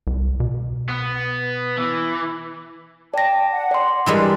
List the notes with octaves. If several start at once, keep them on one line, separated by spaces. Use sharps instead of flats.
C2
B2
B3
E3
D5 G5 A5 A#6
F#5
D5 C6
E3 G3 G#3 D4 A#4